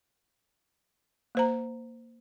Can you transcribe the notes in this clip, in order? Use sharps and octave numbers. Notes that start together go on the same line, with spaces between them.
A#3 C5 A#5